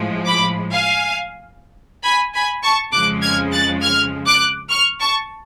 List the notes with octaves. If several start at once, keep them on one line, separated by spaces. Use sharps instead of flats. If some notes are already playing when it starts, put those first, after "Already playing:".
Already playing: A2 F3 G#3
B5 D6
F5 G#5
G#5 B5
G#5 B5
A5 C#6
F2 C#3 F3 G#3 D6 F#6
F6 G#6
F#6 A6
F6 G#6
D6 F#6
C#6 F6
A5 C#6